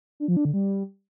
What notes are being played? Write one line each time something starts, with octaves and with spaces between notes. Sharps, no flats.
D4
F3
D4
D3
G3